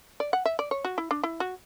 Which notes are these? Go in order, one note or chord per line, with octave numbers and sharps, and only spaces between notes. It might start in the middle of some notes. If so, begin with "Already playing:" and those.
D5
F#5
E5
D5
C#5
F#4
E4
D4
E4
F#4